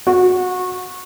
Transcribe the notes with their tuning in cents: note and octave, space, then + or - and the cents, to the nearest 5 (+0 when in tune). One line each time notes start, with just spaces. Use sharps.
F#4 -25